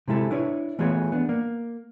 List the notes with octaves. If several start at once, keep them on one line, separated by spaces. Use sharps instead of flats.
C3 G#3 E4 A4
D4 E4 B4 C#5
E3 A3 B3 F4 G#4 C#5
B3 D4
A#3